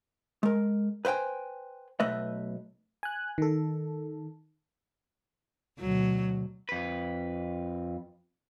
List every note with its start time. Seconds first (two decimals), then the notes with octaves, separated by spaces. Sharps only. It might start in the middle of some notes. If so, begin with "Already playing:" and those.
0.43 G#3 A#4
1.05 B4 C5 E5 G5 G#5
2.00 B1 A3 B4 D#5 E5
3.03 G#5 F#6
3.38 D#3 A4
5.79 D2 B2 F#3
6.69 F2 B4